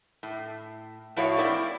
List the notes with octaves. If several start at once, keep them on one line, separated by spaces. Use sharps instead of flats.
A2
A2 F3 E4 F#4 C#5 F5
A#3 C4 E4 A4 D5